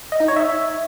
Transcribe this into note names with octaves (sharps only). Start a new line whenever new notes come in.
D#5
D#4
C#5
E5